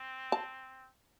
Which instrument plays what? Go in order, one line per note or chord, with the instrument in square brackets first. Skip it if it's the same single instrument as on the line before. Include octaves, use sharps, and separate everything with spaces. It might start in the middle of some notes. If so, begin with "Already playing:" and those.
Already playing: [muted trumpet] C4
[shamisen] A5